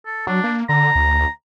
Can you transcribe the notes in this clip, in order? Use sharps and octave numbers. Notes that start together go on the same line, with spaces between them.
A4
F#3 D4
A#3
D3 A#5
D2